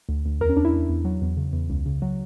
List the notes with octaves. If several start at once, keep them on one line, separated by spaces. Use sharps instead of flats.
D2
D2
E2 A#4
C#4
E2 D4
E4
E2
E2
F#3
E2
C#3
E2
C#2
C#3
F#3